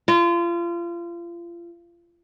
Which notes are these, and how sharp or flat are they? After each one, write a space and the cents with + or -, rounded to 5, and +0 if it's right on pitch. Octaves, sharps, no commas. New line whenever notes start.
F4 -30